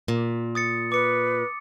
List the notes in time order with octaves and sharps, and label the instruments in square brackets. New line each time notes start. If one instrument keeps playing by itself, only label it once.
[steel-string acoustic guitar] A#2
[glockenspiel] D#6 A6 C#7
[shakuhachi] B4 [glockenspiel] D6 C#7